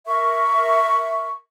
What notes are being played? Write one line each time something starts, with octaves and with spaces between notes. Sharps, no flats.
A#4 E5 C#6